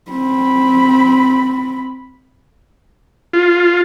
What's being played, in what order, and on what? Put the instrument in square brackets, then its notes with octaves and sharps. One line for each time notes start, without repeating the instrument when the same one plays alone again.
[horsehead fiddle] C4 B5
[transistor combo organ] F4